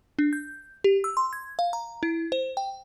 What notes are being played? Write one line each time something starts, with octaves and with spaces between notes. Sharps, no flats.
D4
G6
G4
E6
C6
G#6
F5
A#5
E4
C5
G5